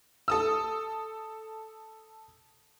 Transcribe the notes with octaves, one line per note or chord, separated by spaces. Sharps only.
A4 D#6 E6